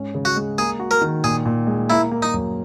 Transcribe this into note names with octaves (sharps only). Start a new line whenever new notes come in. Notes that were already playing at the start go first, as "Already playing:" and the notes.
Already playing: G#2 C#4
C#3
F#4
G#3
A#3 G#4
F#4
A#4
D#3
A#2 G#4
A#2
G#3
A#3 E4
A#3
D#4
F#2